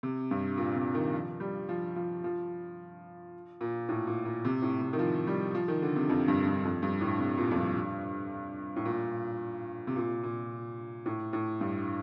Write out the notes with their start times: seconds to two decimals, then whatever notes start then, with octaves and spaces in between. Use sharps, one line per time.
0.03 C3
0.31 G2
0.57 A#2
0.76 C3
0.94 D#3
1.13 F3
1.40 G3
1.69 F3
1.96 F3
2.24 F3
3.61 A#2
3.89 A2
4.07 A#2
4.25 A#2
4.45 C3
4.62 A2
4.81 C3
4.93 D#3
4.99 F3
5.27 G3
5.55 F3
5.68 D#3
5.82 D3
5.96 C3
6.09 F2
6.28 G2
6.46 G2
6.65 F2
6.82 G2
7.01 A2
7.19 C3
7.38 A#2
7.51 F2
7.57 G2
8.76 A2
8.85 A#2
9.87 C3
9.96 A#2
10.23 A#2
11.06 A2
11.33 A2
11.61 G2